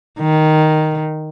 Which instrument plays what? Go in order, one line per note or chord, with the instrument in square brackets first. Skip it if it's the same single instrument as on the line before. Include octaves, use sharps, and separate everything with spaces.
[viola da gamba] D#3